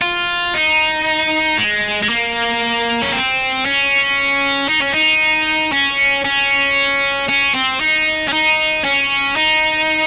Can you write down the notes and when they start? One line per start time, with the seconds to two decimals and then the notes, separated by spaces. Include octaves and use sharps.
0.02 F4
0.54 D#4
1.58 G#3
2.03 G#3
2.09 A#3
3.02 C#4
3.13 C4
3.66 C#4
4.69 D#4
4.82 C#4
4.94 D#4
5.73 C#4
6.25 C#4
7.29 C#4
7.55 C4
7.81 D#4
8.28 C#4
8.33 D#4
8.85 C#4
9.36 D#4